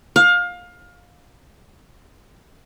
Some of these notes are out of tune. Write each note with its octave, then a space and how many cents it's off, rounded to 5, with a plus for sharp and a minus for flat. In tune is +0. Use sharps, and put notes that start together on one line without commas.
F5 +25